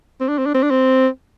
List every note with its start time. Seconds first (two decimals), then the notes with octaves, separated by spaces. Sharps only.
0.21 C4
0.29 D4
0.38 C4
0.46 D4
0.55 C4
0.63 D4
0.71 C4